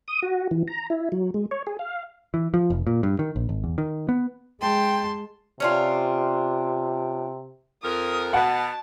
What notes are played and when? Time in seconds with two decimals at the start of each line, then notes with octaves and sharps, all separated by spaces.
0.08 D#6
0.22 F#4
0.51 E3
0.67 A#5
0.90 E4
1.12 F#3
1.34 G#3
1.51 C#5
1.67 G#4
1.79 F5
2.34 E3
2.54 F3
2.70 F1
2.87 A#2
3.03 G2
3.19 D#3
3.36 A#1
3.49 G#1
3.64 E2
3.78 D#3
4.09 B3
4.62 G#3 G5 A5 C6
5.60 C3 C#4 D4 F4
7.83 F2 A#4 D#6
8.33 B2 F#5 A5